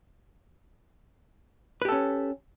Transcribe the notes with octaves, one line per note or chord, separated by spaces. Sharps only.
C#4 G4 A4 B4